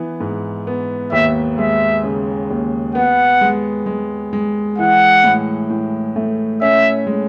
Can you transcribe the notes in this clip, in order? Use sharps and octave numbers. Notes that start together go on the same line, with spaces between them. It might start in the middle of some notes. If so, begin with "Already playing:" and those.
Already playing: E3 B3
G#2
B3
D#2 E5
G#3 E5
C#3
D#2
B3 F#5
G#3
G#3
G#3
E3 F#5
A2
A2
A3
C#4 E5
G#3